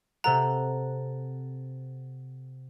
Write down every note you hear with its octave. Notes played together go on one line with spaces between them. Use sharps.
C3 A4 F#5 A#5